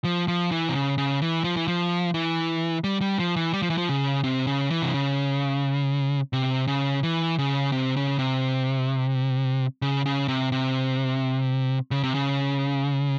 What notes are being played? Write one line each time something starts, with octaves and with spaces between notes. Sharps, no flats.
F3
F3
E3
C3
C#3
C#3
E3
F3
E3
F3
E3
G3
G3
F3
E3
G3
F3
E3
F3
C#3
C3
C#3
E3
C3
C#3
C3
C#3
E3
C#3
C3
C#3
C3
C#3
C#3
C3
C3
C#3
C3
C#3